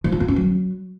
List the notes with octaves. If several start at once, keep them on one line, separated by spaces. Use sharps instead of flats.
F3
F4
B3
C#4
F#3